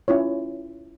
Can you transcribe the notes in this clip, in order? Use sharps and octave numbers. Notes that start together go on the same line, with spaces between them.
C#4 E4 F4 C#5